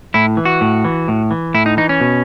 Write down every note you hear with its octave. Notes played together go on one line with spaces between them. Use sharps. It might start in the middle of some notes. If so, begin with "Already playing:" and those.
A2 E4
E3
F#4
A2
E3
A2
E3
A2 E4
D#4
E3 D#4
C#4
B2